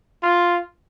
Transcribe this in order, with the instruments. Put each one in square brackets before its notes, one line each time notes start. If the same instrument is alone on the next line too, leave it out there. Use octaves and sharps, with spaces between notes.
[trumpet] F4